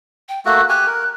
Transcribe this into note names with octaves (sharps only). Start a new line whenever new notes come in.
G5
A3 A#3 F#4 F#6
G4 G#5 F#6
A#4